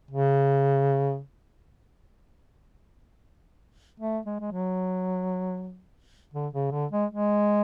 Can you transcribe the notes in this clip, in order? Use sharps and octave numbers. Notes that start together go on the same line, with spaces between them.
C#3
A3
G#3
G#3
F#3
D3
C#3
D3
G#3
G#3